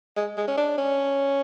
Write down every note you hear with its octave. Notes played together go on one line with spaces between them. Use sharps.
G#3
G#3
C#4
D4
C#4